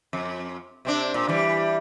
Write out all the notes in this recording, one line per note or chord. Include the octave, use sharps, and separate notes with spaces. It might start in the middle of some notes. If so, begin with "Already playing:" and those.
F2
C3 C4 D4
A#2
E3 G3